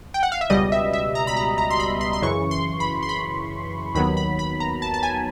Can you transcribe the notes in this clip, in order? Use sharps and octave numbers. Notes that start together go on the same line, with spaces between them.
G5
F#5
F5
E5
C#2 B2 G3 D#5
E5
E5
A#5
B5
A#5
A#5
C6
B5
C6
C6
F#2 C#3 E3 C#6
C6
B5
C6
B5
D#2 D#3 F#3 B3 B5
B5
B5
A#5
A5
A5
G#5